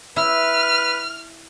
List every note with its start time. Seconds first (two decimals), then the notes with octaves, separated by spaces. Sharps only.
0.16 E4 B4 F6